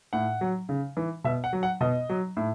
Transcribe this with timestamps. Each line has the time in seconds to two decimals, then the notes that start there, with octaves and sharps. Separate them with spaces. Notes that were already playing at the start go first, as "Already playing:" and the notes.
0.13 A2 F#5
0.41 F#3
0.69 C#3
0.97 E3
1.24 B2 E5
1.44 F#5
1.53 F#3
1.63 F#5
1.81 B2 D#5
2.09 F#3
2.37 A2